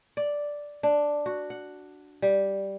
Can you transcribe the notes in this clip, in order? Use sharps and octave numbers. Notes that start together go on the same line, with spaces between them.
D5
D4
F#4
F#5
G3